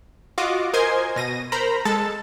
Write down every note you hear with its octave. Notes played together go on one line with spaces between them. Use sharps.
F4 F#4 D#5 D6
A#4 C5 D#5 G#5 C6 G#6
B2 A#6 D#7
A#4 C5 A#5 B5
G#3 A4 A5 A6